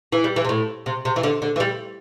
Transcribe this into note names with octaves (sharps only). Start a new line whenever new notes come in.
E3
G3
E3
C3
A2
C3
C3
E3
D3
D3
E3
G3